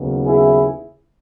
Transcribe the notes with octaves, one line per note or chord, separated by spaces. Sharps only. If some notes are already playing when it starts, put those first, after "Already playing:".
Already playing: D#2 C#3 F#3 B3
E4 G#4